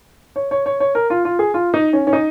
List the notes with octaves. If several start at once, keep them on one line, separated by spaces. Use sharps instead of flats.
C#5
C#5
C#5
C#5
A#4
F4
F4
G#4
F4
D#4
C#4
C#4
D#4